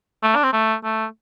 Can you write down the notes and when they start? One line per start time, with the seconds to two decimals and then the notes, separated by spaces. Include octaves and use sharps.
0.23 A3
0.36 D4
0.44 C4
0.53 A3
0.84 A3